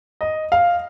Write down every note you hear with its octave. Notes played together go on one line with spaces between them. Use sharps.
D#5
F5